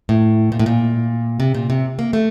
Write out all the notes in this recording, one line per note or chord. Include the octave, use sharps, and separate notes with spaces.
A2
A#2
A2
A#2
C3
A#2
C3
A#3
A3